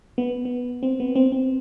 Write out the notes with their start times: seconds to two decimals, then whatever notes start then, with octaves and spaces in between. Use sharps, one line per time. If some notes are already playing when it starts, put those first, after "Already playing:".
0.18 B3
0.45 B3
0.83 C4
1.00 B3
1.16 C4
1.32 C4